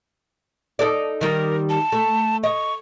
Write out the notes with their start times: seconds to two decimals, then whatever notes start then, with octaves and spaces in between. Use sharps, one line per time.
0.79 D#4 A4 D5
1.21 D#3 G3 A#4
1.70 A5
1.92 A3
2.44 D#5 C#6